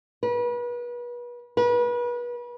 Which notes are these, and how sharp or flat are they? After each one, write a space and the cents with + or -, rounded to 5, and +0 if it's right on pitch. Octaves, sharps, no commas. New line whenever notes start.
B4 -35
B4 -35